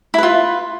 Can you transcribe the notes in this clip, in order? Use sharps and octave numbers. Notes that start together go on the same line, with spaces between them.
E4 F4 B4